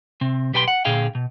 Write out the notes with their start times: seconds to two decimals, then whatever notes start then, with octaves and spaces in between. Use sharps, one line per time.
0.21 C3 C4
0.54 B1 G4 B4 G5 A5 C6
0.68 F#5
0.85 A#2 D3 G#4 F5 G5
1.15 B2